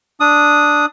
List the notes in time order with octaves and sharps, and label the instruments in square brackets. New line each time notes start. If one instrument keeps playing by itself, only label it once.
[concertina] D4 D#6